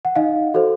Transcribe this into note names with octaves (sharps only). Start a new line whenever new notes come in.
F#5
D#4 D#5 F5
F#4 A4 C5